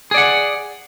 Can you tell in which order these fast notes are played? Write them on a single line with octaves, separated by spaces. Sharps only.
G#4 D5 F#5